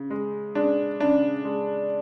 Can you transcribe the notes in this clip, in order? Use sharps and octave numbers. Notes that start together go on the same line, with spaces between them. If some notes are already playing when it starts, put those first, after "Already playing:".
Already playing: C#3
G#3
G#3 D4
C#3 D4
G#3